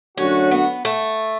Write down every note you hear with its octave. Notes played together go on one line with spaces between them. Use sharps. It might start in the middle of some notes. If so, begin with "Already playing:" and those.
F#2 D3 A3 C#4 D4 F#4
B3
A3